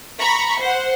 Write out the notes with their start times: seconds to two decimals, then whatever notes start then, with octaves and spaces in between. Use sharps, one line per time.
0.20 A#5 B5 C#6
0.59 C5 F#5